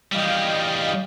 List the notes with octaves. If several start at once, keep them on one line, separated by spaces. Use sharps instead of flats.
E3 G3 D#5 F5 G5